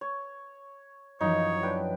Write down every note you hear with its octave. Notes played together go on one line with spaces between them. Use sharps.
C#5
F#2 E3 F3 D#4 C#5
D4 B4 G5